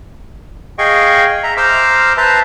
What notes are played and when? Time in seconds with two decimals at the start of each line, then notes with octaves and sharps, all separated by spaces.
0.79 G#4 D#5 F5 G5 C#6
1.43 E5 A#5
1.57 C5 A#5 C6 D6 E6 F6
2.17 B4 C5 E5 A5 A#5 C6